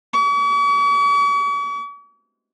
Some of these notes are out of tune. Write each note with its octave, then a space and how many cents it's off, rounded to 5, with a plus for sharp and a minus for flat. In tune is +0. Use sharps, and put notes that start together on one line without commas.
C#6 +45